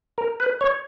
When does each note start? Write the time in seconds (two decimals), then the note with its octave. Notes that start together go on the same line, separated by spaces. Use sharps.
0.18 A#4
0.40 B4
0.61 C#5